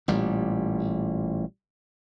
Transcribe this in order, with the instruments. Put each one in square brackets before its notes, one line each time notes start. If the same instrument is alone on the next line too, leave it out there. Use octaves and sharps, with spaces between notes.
[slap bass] A1 A#2 G3